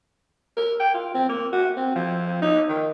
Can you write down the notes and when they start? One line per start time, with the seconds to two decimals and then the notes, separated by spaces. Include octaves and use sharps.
0.57 A#4
0.79 G5
0.94 F4
1.14 C4
1.29 A#3
1.52 F#4
1.77 C4
1.95 F3
2.42 D#4
2.69 D#3